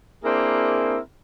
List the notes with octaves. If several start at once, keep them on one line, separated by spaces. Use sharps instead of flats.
A#3 C4 D4 E4 G#4 A#4